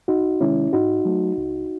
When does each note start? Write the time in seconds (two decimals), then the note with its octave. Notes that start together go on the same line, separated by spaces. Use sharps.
0.08 C2 D#4 F#4
0.41 C3 D#3 G#3 C#4 E4
0.73 G#2 D#4 F#4
1.05 F#3 A3
1.38 C#2